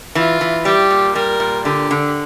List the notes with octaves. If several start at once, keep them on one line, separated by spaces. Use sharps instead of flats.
E3 F4
E3
G3 G4
A#2
G3 A#4
A#2
D3 G4
D3